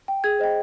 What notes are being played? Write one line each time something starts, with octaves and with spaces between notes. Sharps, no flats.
G5
G#4 G#6
C5 D#5 G5